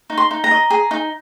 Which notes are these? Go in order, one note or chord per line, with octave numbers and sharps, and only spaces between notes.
D#4
C6
D#4
A#5
D#5
G#4
D#4